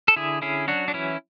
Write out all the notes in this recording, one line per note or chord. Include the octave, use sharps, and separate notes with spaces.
A4
D3 E4 G#4
C#4 E4 G#4
F#3 D4 F#4
D4
E3 C#4 E4